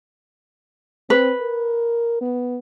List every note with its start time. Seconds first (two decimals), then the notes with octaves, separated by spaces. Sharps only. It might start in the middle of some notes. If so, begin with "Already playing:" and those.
1.10 C4 B4
1.41 A#4
2.21 B3